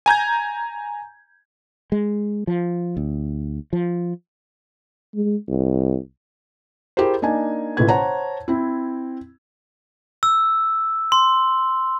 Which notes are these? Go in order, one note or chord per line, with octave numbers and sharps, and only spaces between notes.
G#5 A#5 G6 G#6
G#3
F3
D2
F3
G#3
C2
E4 G4 G#4 A#4 C5
A#3 D4 D#4 G#5
A1 A2 C#3 F4 B4 G#6
C5 C#5 F#5 A5 A#5
C4 E4
E6
C6